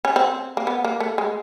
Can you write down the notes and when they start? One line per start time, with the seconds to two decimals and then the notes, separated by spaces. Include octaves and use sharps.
0.05 C#4
0.16 C4
0.57 A#3
0.67 B3
0.84 A#3
1.00 A3
1.18 G#3